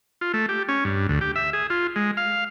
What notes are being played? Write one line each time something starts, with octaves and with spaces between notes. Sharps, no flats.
F4
A3
G4
C#4
G2
D2
G4
E5
G#4
F4
G#3
F5